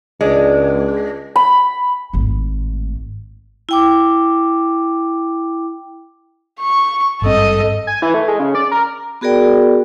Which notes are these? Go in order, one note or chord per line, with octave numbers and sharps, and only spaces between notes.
C#2 G#3 D4
B5
G#1 A2
E4 G5 D6
C#6
G#1 G2 C4 A4 D#5
G#5
E3
A3
G#3
C#3
D5
A#4
B3 F#4 G#4 A#4 D5 G5